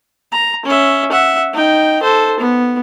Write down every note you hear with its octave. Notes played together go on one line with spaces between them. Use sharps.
A#5
C#4 E5
E5 F#5
D#4 G5
A4 C5
B3